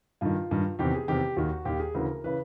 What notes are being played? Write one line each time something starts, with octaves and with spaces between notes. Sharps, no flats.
G2 D#3 F4
G2 D#3
E2 C3 D#3 G4
G#4
E2 C3 D#3 G4
D#2 D#3 F#4
D#2 D#3 G4
G#4
D2 C#3 E3 A#4
C#3 E3 B4